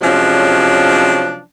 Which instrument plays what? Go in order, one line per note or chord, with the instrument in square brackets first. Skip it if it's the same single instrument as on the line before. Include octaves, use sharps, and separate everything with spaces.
[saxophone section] C3 F3 F#3 G#3 C#4 D4